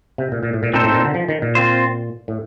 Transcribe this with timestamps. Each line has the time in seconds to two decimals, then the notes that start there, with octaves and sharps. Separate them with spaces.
0.18 C3
0.32 A#2
0.43 A#2
0.53 A2
0.63 A#2
0.73 A#2 C4 D#4 A4 C5
0.84 A2
0.94 A#2
1.04 D3
1.14 F3
1.29 D#3
1.42 A#2
1.55 C4 F4 C5
2.28 A2